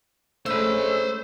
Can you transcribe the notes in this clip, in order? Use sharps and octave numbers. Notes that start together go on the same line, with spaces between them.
G#3 A3 C#4 D4 A4 C5 B5 E6